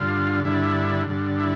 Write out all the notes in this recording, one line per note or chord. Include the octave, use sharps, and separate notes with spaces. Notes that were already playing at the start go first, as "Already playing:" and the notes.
Already playing: G2 D3 F4
G2 D3 E4
G2 D3
E4